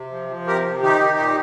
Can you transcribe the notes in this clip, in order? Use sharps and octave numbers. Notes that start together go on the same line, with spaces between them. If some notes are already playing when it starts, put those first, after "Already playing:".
Already playing: C3
F3
F3
C3 G4 A#4
C3
D#3 D#4 G4
D#3
A#2